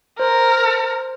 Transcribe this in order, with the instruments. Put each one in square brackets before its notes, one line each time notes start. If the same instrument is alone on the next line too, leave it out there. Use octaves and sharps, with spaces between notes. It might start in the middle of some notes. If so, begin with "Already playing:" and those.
[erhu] A#4 [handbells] C5